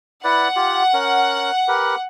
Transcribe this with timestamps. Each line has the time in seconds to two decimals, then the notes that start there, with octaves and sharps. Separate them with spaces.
0.24 E4 B4 D5 F#5
0.56 F4 G4
0.94 C#4 A#4
1.68 G4 A#4 B4